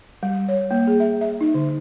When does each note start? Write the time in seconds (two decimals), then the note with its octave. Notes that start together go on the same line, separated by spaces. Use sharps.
0.23 G3
0.49 C#5
0.71 A#3
0.87 G#4
1.00 E5
1.21 E5
1.41 D#4
1.54 D3